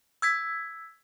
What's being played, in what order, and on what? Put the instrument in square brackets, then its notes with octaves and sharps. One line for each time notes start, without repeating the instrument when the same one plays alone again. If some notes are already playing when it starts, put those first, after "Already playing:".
[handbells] E6 G#6 B6